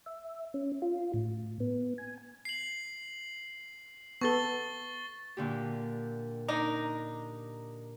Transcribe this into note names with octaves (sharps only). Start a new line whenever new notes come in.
E5
C#4
F4
A2
B3
G#5
C7 F#7
B3 A4 C#6 A6 G7
A#2 D3 G4
D4 D#4 A#4 D5